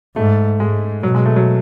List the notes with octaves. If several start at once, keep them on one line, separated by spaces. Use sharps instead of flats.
G#2 A3
G#2 G#3
B2 F#3
G#3
A3
F#3